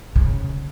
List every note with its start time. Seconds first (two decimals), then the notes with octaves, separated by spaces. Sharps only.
0.16 C#3